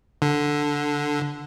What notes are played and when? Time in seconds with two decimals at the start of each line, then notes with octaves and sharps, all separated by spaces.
0.22 D3